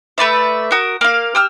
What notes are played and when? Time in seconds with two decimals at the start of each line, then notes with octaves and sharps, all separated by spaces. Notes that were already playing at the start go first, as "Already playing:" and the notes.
0.18 A3 B4 D5 E5
0.72 F#4 A#4 D#6
1.01 A#3 F5
1.35 G4 E6 F6